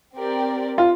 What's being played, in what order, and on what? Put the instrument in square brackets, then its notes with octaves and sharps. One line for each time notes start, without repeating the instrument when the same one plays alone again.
[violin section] C4 G4 A#4 D5
[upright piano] F4